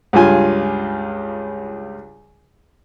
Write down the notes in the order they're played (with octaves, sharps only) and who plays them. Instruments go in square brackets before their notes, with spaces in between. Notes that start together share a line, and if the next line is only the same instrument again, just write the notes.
[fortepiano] C#2 G2 F4 G#5